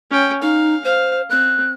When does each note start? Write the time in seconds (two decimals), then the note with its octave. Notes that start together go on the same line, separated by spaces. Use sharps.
0.11 C#4 G5
0.42 D#4 F5
0.85 C5 F5
1.30 C4 F#6